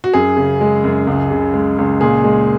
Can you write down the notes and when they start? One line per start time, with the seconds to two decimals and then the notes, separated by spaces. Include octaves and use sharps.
0.04 F#4
0.14 F#2 G#4
0.37 C#3
0.61 G#3
0.84 F#2
1.07 C#2
1.31 C#3
1.54 G#3
1.78 C#2
2.01 A#2 G#4
2.24 G#3